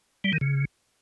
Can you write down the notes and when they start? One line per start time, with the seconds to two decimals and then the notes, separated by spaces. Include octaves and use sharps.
0.24 G3
0.33 D#3
0.41 C#3